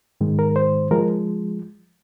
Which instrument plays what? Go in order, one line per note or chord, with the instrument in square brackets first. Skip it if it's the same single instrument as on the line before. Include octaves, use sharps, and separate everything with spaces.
[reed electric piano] G#2 D#3 G#3
A#4
C5
F3 G#3 A#4